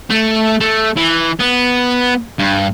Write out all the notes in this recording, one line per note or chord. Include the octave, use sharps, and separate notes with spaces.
A3
A3
E3
B3
G2